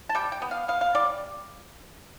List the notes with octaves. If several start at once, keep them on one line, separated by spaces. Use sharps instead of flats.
A5
G3 G5
G5
B3
F5
B3 F5
F5
G3 D5